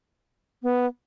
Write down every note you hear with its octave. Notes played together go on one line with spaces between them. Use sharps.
B3